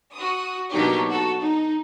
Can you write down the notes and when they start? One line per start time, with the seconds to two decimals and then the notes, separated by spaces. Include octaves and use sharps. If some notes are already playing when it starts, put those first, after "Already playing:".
0.14 F#4 D#6
0.71 B2 F#3 A#3 D4 D#4 G4
1.08 F#4 A4
1.40 D#4